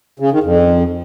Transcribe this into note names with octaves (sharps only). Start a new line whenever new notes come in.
C#3
D#3
F2